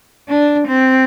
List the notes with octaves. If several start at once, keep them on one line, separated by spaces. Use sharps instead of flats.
D4
C4